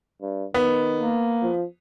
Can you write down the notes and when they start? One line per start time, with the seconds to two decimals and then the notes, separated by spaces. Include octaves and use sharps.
0.22 G2
0.54 D#3 B3
1.00 A#3
1.42 F3